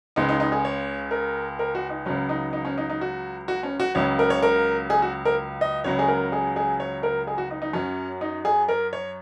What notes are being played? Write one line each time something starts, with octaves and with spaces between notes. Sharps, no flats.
C#2 C#3 G#3 D#4
D#4
D#4
G#4
C#5
A#4
A#4
F#4
D#4
C#2 C#3 F#3 C#4
D#4
D#4
C#4
D#4
D#4
F#4
F#4
C#4
F#4
C#2 C#3 F#3 C#5
A#4
C#5
A#4
G#4
F#4
A#4
D#5
C#2 C#3 F#3 C#5
G#4
A#4
G#4
G#4
C#5
A#4
G#4
F#4
D#4
D#4
F#2 F#3 C#4
D#4
G#4
A#4
C#5